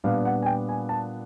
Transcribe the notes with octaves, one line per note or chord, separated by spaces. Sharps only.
A#2 G3 B3 D4 F5
F#5
G#5
G5
G#5
A5